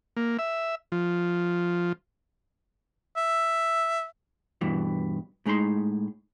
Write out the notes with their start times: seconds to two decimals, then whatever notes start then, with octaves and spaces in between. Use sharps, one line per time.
0.17 A#3
0.39 E5
0.92 F3
3.17 E5
4.61 G2 B2 E3
5.46 A2 G#3 D#4 B5 C6